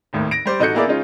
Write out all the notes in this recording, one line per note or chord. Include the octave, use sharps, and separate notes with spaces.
G#1 D#2 A2
A#6 D7
G3 C5 D5
A1 D#4 F#4 A4 G6 C#7
A#3 B3 E4 G#4 A#4 D5
C#3 G#3 C#4 D#4 F4